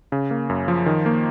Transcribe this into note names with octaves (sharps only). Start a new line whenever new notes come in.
C#3
A#3
F#2
F3
D#3
A#3